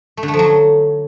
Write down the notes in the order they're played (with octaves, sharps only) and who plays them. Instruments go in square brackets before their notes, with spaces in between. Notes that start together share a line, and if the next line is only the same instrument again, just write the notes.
[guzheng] A3
D3
A3
F3
F#3